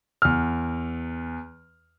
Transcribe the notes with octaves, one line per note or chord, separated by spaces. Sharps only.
E2 F6